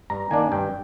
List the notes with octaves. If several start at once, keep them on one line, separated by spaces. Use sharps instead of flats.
G2 A#5
D#3 A#3 D4 G#5
G2 G5